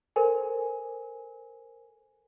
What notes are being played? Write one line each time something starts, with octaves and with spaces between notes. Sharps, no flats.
A4 A#4 C5 G#5